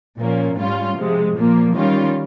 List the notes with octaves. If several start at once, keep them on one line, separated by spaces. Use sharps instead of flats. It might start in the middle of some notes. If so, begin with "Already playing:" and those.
A#2 F3 A#3 C#4
G#2 G3 C#4 F4
C3 F3 G#3
A#2 F3 A#3
D#3 G3 C#4 F4